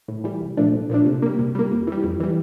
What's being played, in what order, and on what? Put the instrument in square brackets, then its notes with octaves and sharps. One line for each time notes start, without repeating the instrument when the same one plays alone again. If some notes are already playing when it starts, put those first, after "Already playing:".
[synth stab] A2
E3 G3
C2
A#2 F3 A3 D4
C2
A#2 F3 A3 D4
C3
G3 A#3
C3
G3 A#3
F2
E3 G3
F2
E3 G3